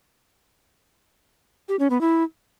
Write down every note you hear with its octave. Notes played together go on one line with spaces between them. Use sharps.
G4
C#4
B3
E4